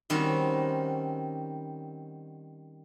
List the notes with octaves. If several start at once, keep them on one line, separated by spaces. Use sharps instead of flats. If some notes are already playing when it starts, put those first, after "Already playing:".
D#3 G3 C4 C#4 F#4